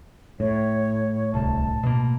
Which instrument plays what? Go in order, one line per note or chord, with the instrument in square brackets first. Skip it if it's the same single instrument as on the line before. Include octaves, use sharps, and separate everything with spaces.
[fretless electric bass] A2 [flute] C#5
[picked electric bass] D1 C2 [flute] A5
[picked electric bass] B2 A#3